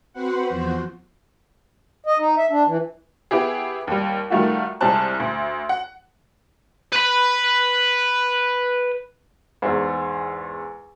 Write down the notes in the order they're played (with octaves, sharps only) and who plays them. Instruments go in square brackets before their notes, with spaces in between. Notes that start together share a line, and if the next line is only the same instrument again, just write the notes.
[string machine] C4 F#4 B4 C5 F#5
E2 F3 F#4 C5
[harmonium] D#5
D#4
E5
D4
E3
[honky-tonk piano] B3 E4 G4 G#4
D#2 G3
D#3 G3 A3 F4 F#4
C2 G3 G#3 C5 A5 F#6
D2
F#5
[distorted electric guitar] B4 B5
[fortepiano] E2 G#2